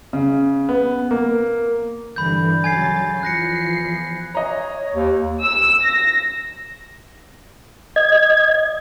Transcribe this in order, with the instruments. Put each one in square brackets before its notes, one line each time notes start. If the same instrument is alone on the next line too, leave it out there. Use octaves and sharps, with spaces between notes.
[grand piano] C#3
B3
A#3
[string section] G2 D3 E3 [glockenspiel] B5 G6
[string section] C#3 F#3 A6 [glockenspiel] G#5 G#6 C7
[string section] E2 F3 C7 [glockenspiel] F#6 A#6 C#7
[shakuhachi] C#5 [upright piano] D#5 A#5
[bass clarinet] D#2
[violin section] E6
A#6
[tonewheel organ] D#5 G#6